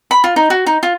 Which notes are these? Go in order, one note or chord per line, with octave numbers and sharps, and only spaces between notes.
B5
F4
D#4
F#4
D#4
F4